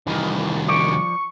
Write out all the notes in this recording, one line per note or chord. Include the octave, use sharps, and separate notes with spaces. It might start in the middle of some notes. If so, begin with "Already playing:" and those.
C2 D#3 E3
F3 D5 C#6